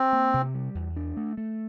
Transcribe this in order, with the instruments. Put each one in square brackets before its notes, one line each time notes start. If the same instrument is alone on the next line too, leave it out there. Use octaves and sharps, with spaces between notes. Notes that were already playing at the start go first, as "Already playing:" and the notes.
Already playing: [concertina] C4
[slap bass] A#3
C3
G3
E2
D4
A3
A3